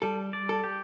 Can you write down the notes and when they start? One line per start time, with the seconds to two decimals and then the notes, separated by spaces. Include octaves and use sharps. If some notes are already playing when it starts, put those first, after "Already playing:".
0.02 G3 A4
0.33 D5
0.49 A4
0.64 G4